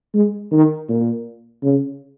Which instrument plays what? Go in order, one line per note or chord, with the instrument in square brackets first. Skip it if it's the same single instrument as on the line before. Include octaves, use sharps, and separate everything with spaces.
[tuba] G#3
D#3
A#2
C#3